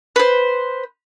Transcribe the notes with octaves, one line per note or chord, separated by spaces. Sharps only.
B4 C5